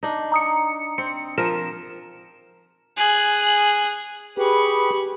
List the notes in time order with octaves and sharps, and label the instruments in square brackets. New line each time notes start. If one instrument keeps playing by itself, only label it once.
[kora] D4 D#4
[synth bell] A#5 D#6 C#7
[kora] C4 [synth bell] C#7
[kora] F3 A#4 [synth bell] E7
[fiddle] G#4 F#6
[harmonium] G4 G#4 B4 [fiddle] B5 C#6